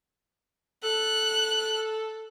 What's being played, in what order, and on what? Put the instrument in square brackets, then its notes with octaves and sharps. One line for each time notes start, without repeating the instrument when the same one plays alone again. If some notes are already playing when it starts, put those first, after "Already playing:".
[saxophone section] A4 [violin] F#6